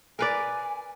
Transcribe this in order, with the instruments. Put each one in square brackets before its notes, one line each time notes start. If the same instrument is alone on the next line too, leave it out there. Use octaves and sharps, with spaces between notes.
[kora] A#4 B4 D5 [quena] G#5